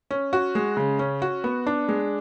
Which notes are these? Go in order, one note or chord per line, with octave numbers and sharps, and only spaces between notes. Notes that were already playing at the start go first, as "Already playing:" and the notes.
C#4
F#4
G#3
C#3
C#4
F#4
B3
D4
G#3